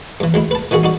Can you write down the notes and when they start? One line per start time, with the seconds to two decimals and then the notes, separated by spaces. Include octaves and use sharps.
0.20 G2 E3
0.34 D2 G#3 E4
0.51 B4 A5
0.71 D#3 E3 F#4 G#4 F#5
0.83 D#4 F#4 D5